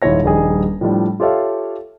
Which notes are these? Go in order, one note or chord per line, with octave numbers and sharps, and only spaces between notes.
D#1 G#2 E4 F4 C#5 A#6
D#1 A#1 G3 D#4 G#4 G#5
A2 F3 G3 D4
F4 G4 A4 C#5 E5 F5